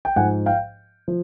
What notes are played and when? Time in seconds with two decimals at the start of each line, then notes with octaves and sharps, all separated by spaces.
0.05 G5
0.16 G#2 F3 F#5 G#5
0.46 F5 G5
1.08 F3